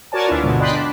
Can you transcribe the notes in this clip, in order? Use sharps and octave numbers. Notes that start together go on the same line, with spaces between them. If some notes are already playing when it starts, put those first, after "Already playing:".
F#4 A#4 C#5 D5 G#5 A5
D2 D4 E4 F4 B4
G#2 B2 D3 G#3 B3
D5 D#5 G5 B5 C6 F#6
D4